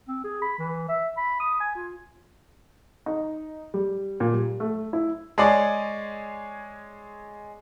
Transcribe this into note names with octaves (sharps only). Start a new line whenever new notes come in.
C4
G#4
B5
E3
E5
B5
D#6
G#5
F4
D#4
G3
A#2
G3
A3
E4
G#3 G#4 C#5 D5